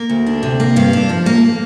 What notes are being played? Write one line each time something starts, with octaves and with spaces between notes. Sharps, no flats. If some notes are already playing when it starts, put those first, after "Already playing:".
Already playing: A#3
D2
D4
C3
A#3
G2 F5
D4
F3
A#3